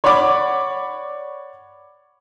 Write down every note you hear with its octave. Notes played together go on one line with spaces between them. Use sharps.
C#5 D5 F#5 B5 D6